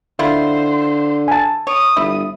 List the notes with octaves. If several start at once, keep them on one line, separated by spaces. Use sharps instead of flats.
D3 E4 F4 C5
G#5 A5
C#5 D#6
G1 E4